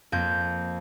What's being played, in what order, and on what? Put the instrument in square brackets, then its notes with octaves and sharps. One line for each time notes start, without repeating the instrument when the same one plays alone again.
[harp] F2 A#3 G6